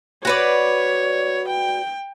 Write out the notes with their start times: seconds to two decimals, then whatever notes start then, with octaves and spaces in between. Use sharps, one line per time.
0.25 F#4 B4 C#5 D5
1.49 G5